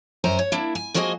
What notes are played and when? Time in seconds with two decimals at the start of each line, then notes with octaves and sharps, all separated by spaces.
0.24 F#2 C5 G#5 A#5
0.39 C#5
0.52 A#3 D4 E4
0.75 G#5
0.94 F3 A#3 F#4 G#4 D#5 G#5